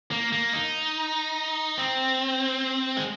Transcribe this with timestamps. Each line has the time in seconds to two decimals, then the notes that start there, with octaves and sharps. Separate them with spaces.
0.11 A#3
0.32 A#3
0.53 D#4
1.78 C4
2.97 G#3